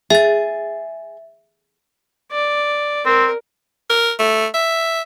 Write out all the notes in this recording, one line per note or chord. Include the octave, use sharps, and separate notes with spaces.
G#4 E5 A6
D5
C4 A#4
A#4
A3
E5